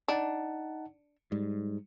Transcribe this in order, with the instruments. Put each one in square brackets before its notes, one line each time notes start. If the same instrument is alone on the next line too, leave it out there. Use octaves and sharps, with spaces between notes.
[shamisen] D4 [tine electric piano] D#4 F#5 A5
[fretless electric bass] G#2 [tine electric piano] G3